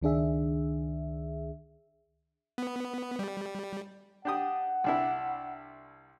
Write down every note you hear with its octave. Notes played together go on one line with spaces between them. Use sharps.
C#2 D#3 D4 G#4 E5
B3
G3
D4 G4 F#5 D#6
C2 D4 E4